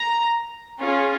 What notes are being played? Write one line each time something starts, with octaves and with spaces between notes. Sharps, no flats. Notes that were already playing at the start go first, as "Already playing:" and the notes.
Already playing: A#5
C#4 F4 G#4